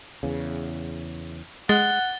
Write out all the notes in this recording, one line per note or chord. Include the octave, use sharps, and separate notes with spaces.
E2 C#3
G#3 F#5 A6 G7